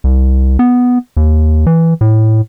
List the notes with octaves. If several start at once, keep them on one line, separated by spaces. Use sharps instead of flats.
C2
B3
D#2
E3
A2